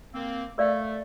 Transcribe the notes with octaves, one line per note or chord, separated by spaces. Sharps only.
A#3 C4
A3 A#4 D5 F5